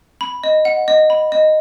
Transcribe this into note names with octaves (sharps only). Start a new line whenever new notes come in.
B5
D#5
F#5
D#5
B5
D#5